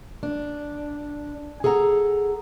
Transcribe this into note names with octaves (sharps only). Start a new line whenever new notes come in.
D4
G#4 A4 F#5 A5 A#5